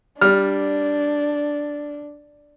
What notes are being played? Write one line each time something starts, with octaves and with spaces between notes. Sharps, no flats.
G3 D4 F6